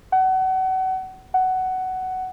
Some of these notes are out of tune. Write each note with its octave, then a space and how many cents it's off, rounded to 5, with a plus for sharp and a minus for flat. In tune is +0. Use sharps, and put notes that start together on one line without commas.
F#5 +30
F#5 +15